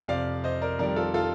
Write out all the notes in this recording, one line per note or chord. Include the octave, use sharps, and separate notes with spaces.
F2 C3 F3 D5 F5
C5 D#5
A#4 D5
F2 D#3 G3 A#4 D5
F4 A4
F4 A4